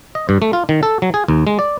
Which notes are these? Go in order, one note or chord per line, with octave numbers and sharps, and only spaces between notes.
D#5
G2
A3
F4
D#3
A4
F#3
G#4
D#2
G#3
D5